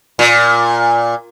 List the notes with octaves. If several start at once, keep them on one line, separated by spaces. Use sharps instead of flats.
A#2